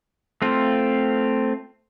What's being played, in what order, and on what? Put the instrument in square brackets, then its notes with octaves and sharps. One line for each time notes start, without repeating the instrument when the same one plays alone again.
[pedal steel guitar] A3 C4 F4